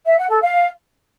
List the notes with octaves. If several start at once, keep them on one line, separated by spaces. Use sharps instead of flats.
E5
F#5
A4
F5